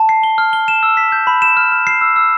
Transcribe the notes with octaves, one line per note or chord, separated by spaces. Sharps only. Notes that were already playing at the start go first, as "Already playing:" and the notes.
Already playing: A5
C7
G7
F6
G7
E7
E6
B6
G6
B5
E7
F6
F6
C7
E6
E6